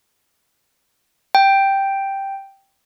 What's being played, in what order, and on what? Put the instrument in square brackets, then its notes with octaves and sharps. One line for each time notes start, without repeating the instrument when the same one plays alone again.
[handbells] G5